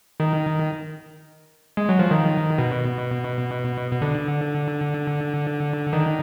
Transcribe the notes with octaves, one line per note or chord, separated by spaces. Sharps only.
D#3
G#3
F#3
F3
D#3
B2
B2
D3
D#3